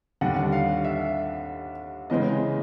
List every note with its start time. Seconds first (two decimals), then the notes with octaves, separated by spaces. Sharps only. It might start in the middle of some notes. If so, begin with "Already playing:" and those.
0.21 D#2 D3 G3 F#5
0.52 F5
0.85 E5
2.10 C#3 E3 G#3 C4 D#5